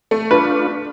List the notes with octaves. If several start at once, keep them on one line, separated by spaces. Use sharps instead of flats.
A3
D4 F4 B4